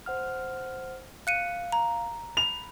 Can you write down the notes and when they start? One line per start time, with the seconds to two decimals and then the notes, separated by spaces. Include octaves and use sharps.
0.06 C5 F#5 F6
1.27 F5 F#6 C#7 D#7
1.72 A#5
2.37 B5 F7